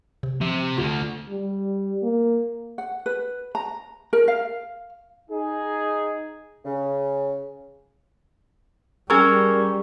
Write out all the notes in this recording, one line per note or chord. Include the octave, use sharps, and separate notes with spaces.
C3
C3 F3
D2 D3 F4
G3
A#3
F#5
B4
A#5
A#4
F5
D#4 G#4
C#3
G3 C#4 G#4 A#4 G#5 C#6 E6 G#6